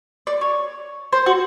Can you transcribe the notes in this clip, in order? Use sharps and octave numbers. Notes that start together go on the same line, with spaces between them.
D5
C#5
C5
F#4